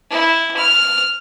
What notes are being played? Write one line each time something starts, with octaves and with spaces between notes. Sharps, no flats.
E4
F6